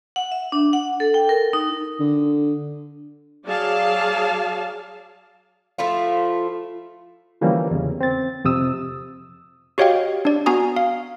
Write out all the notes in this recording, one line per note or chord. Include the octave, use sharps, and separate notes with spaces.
F#5
E5
D4
F#5
A4
G5
A#4
D#4
D3
F#3 G#4 D5 F5 A5
F3 A3 E4 F4
D3 E3 F3 G3 A#3 C#4
E2 C#3
C4 A6
F2 C3 D#6 E6
F#4 G4 C#5 D#5 F5 G5
D4 D5
B3 F#4 G#5 A#5 D#6
F5